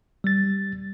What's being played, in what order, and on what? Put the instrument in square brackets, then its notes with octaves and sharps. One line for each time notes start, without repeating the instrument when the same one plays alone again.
[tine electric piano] G3 A6